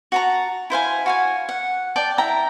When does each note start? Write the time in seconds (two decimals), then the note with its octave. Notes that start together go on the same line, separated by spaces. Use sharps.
0.12 F#4 A5 A#5
0.70 E4 C5 F5 G#5
1.06 F#4 F5 G#5
1.49 F#5
1.96 D5 G5 A5
2.18 E4 G5 A#5